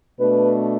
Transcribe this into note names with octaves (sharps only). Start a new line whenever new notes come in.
B2 A3 D4 B4